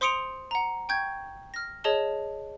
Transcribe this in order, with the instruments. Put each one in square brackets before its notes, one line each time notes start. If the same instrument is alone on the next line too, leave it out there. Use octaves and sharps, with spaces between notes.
[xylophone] C5 C6 D#6 C#7 D7 F7
F#5 A#5
G5 C#6 G6 G#6
F6 A#6
G#4 C#5 D#5 A5 G7